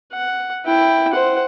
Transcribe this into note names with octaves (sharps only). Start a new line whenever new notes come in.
F#5
E4 G5
C5 F#5